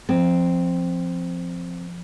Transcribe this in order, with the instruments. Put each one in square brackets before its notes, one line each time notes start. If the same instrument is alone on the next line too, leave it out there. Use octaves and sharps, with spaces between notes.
[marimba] F3 [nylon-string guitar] C4